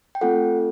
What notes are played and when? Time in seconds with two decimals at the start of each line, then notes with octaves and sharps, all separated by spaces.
0.15 G5
0.21 A3 C4 F4 A4 F#5